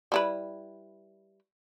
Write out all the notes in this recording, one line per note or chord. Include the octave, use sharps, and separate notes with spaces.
G3 E4 B4